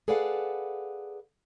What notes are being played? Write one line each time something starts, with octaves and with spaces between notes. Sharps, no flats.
G#4 A4 B4 D5 F5 F#5